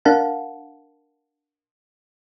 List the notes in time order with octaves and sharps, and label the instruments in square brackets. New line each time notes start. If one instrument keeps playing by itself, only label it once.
[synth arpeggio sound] D4 A#4 F5 F#5 A5